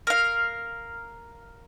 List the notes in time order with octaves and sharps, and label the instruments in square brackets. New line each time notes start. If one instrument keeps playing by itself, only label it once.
[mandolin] A#4 F5